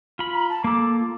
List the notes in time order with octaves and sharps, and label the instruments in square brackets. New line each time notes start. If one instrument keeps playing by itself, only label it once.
[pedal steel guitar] F4 B5
[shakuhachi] A#5
A5
[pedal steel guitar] A#3 A4 [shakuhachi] D6
[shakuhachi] F4